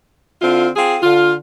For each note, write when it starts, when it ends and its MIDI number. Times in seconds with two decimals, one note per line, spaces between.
0.42 0.68 50
0.42 0.68 60
0.42 0.68 64
0.42 0.68 65
0.76 0.97 60
0.76 0.97 65
0.76 0.97 68
1.02 1.34 50
1.02 1.34 65